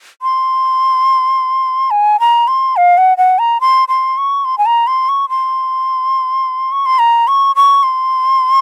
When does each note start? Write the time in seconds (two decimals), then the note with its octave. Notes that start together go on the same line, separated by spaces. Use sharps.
0.22 C6
1.91 G#5
2.20 A#5
2.48 C6
2.76 F5
2.98 F#5
3.18 F#5
3.39 A#5
3.61 C6
3.88 C6
4.18 C#6
4.45 C6
4.58 G#5
4.66 A#5
4.87 C6
5.09 C#6
5.29 C6
6.72 C#6
6.86 C6
6.99 A#5
7.27 C#6
7.56 C#6
7.83 C6